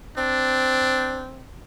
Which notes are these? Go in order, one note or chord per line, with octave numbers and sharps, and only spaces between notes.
C4 D4